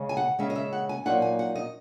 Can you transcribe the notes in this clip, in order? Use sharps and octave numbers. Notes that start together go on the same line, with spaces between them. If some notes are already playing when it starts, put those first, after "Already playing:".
Already playing: C#3 G#3 C#4
G#5
F#5
C#3 G#3 C#4 E5
D#5
E5
F#5
G#5
A#2 F#3 A#3 D#4 F#5
G#5
F#5
D#5